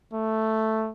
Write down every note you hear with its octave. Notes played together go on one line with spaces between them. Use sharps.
A3